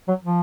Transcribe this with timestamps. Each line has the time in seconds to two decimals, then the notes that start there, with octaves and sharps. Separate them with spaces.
0.08 F#3
0.24 F3